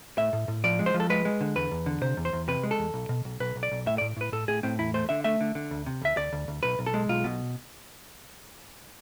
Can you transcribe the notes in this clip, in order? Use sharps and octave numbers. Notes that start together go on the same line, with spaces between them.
A2 E5
A2
A2
F3 D5
G#3
C5
F3
A4
G#3 B4
G#3
D3
E2 B4
E2
D3
C3 C5
E2
C5
E2
C3 B4
G#3
A4
E2
B1
B2
B1
B1 B4
B1
D5
B1
A2 E5
A2 D5
A2 B4
A2 A4
A2 G#4
A2 C4
E2 E4
A3 C5
D3 E5
A3 E5
D3
D3
D2
C3
D2 E5
D2 D5
D2
D2
B1 B4
B1
A4
G#3
B1 F4
B2